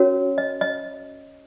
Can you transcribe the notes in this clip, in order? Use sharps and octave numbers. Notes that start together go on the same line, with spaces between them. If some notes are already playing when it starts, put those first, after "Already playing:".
Already playing: C#4 F#4 A#4 C#5
D#5
D#5